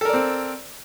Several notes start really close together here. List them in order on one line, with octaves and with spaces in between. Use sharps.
A4 A#4 D5 C4